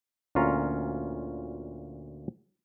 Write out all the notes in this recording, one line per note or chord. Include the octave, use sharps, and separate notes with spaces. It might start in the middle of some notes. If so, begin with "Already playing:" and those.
D2 A#2 C#4 F4 C#5 A#5